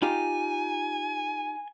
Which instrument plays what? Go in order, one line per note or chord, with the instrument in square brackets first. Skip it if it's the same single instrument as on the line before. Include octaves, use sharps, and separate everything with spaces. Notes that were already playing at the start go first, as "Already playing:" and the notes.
[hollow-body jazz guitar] D#4 F4 G4 [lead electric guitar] G#5